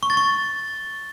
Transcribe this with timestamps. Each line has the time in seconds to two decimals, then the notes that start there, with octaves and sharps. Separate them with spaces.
0.03 C#6
0.10 A6
0.17 C#6